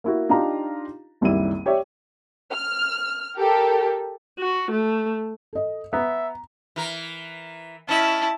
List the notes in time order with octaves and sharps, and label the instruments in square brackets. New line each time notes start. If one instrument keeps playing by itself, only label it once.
[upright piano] A#3 E4 F#4
D4 D#4 F4 G4 A#5
F#1 C2 D#3 G3 E4 D#7
G4 C#5 D5 E5
[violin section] F6
G4 A4 A#4
[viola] F#4
A3
[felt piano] A4 D#5
[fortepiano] B3 [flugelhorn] E5 [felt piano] A#5
[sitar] E3 A#4
[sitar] C#4 D#5 [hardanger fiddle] E4 [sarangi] A5